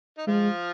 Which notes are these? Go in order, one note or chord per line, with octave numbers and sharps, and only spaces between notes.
D#4
F3 G#3 F4